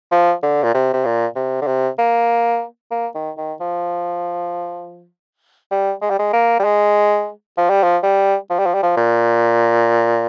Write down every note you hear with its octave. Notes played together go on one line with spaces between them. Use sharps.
F3
D3
A#2
C3
C3
A#2
C3
D3
C3
A#3
A#3
D#3
D#3
F3
G3
G#3
G3
G#3
A#3
G3
G#3
F3
G3
F3
G3
F3
G3
F3
G3
F3
A#2